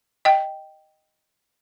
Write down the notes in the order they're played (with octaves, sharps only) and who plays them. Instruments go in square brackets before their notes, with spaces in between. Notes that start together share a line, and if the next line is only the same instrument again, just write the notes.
[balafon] D#5 G5